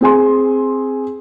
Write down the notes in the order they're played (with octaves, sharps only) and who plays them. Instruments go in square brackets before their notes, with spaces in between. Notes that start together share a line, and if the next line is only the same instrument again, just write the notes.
[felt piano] C4 G#4 G#5 C6